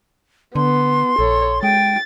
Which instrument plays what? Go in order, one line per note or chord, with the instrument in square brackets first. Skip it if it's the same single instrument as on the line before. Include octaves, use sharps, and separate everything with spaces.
[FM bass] D3 [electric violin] B3 [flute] C6
[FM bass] A#1 [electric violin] A4 C#5
[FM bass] G#3 [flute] G5 [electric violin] A6